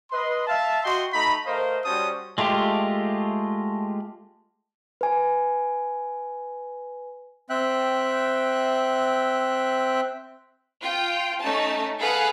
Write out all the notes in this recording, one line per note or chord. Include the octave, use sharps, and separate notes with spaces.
B4 D#5 C6
E5 F5 A5
F#4 D#5 G5 C6
A3 D#4 A#5 B5
A3 A#4 C5 D#5 F5
G3 C#4 F#4 C5 A5 D#6
G#3 A3 F4 G4
B4 G#5
C4 E5 G5 F#6
F4 G5
A3 C#4 D#4 A5
G#4 A4 B4 F5 F#5